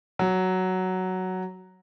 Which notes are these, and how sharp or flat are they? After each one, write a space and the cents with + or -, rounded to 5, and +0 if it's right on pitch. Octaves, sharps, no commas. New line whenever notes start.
F#3 +5